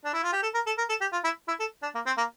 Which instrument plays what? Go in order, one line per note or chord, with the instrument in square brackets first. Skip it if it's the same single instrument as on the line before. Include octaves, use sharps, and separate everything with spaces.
[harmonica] D4
E4
F4
G4
A4
A#4
A4
A#4
A4
G4
F4
E4
E4
A4
D4
A#3
C4
A#3